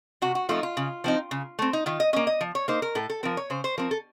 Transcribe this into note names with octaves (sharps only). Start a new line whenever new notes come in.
C3 F#4
F#4
F3 A3 C4 D#4 F4
F4
C#3
F3 C4 D#4
C#3
A3 C4
D#4
D#3 F4
D#5
A#3 C#4 D#5
D#5
F3
C#5
A#3 D#4 C5
A#4
A2 A4
A4
F3 C4 A#4
C#5
C#3 C5
C5
F3 C4 A#4
A4